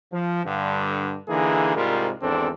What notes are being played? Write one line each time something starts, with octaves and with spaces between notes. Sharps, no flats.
F3
G2 D3
D3 E3 A#3 D#4 G#4
C2 G#2 G3 F4 A#4
G#1 E2 C4 D4 A4